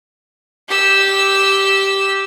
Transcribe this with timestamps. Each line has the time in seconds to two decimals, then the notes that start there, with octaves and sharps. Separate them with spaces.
0.68 G4 E6